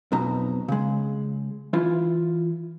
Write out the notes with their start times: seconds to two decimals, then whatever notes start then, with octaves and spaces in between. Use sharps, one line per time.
0.12 B1 F2 B2 A#5
0.68 C#3 G#3
1.73 E3 E4 F4